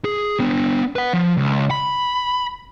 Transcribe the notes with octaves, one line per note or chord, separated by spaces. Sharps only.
G#4
B3 D4
B4 F#5
F3
C#2
B5